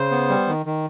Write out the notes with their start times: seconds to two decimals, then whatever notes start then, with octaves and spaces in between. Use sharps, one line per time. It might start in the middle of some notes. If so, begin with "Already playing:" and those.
Already playing: C#3 C5
0.11 B3
0.29 G3
0.48 D#3
0.66 D#3